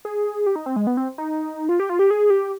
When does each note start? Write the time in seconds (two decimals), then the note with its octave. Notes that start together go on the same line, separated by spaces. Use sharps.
0.05 G#4
0.46 G4
0.56 D#4
0.66 C4
0.76 G#3
0.87 B3
0.97 C4
1.18 D#4
1.69 F4
1.80 G4
1.89 F4
1.99 G4
2.11 G#4
2.30 G4